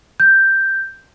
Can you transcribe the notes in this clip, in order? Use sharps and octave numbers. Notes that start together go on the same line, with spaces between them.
G6